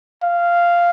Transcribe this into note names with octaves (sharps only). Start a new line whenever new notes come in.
F5